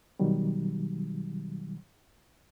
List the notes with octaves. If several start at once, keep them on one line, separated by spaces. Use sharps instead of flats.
B2 D#3 F#3 G3